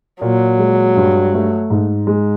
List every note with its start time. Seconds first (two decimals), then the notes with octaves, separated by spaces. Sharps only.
0.21 A#2 F#3
0.59 G#3
0.96 G2
1.34 A3
1.70 G#2
2.07 G#3